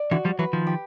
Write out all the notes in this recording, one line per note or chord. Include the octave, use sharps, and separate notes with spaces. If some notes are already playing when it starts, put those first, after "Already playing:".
Already playing: D5
D3 E3 F#4
F3 G3
E3 F#3 B4
D#3 F3
G4